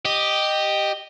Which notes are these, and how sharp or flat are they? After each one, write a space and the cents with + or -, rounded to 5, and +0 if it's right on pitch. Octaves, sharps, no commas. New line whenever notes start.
G4 +0 D#5 -10